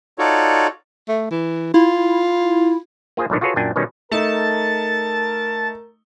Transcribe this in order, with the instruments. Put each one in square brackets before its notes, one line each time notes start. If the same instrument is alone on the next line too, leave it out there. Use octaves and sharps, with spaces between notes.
[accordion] D#4 F4 F#4 A4 C#5 D5
[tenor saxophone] A3
E3
[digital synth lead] E4 [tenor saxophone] F4
[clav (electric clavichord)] A#3 F4 G#4 C5 G#5
B1 A#2 D3 D#3
F4 F#4 G#4 A4 B4 C#5
F#2 A#2 D4 G5 G#5
B2 D#3 G3 C#4 D#4
[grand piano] A3 D#4 [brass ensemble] A#4 [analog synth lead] A5